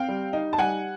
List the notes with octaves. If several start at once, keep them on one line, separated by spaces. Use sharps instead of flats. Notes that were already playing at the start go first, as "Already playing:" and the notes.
Already playing: C4 F5 G5
G3
D#4
A5
G3 F#5 G#5